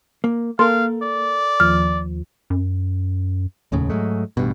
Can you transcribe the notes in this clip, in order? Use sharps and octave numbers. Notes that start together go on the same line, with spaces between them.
A#3
A#3 A4 A#4 F5 C6
D5
D#2 F3 F6
F#2
F1 D#2 A2 C#3
G#2 F#3 G#3 A3
A1 G2 B2